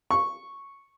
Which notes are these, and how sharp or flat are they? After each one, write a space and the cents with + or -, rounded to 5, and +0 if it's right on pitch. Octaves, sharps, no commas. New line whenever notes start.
C#6 -5